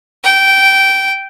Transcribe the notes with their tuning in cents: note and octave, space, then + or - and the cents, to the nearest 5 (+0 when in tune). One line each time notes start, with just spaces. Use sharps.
G5 -15